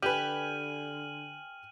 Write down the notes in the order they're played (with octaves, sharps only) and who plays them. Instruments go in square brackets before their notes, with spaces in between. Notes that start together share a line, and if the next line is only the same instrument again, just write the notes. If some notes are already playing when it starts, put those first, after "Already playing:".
[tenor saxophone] D3 [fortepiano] G4 B4 [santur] G5 G#5 [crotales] F6 D#7 F#7